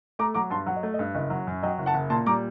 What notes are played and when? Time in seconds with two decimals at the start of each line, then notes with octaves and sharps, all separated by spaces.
0.19 A3 A#5 D6
0.34 F#3 A#5 D6
0.50 G2 A5 C6
0.66 F#3 F#5
0.76 D#5
0.83 A3
0.94 D#5
0.99 G2
1.15 F#1 D#5
1.30 F#3
1.47 F#2
1.63 F#3 D#5 G5
1.78 F#1
1.86 F#5 A5
1.94 F#1
2.10 A#2 A5 C6
2.26 G3 A#5 D6